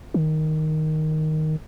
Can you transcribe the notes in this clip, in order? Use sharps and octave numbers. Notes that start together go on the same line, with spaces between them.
D#3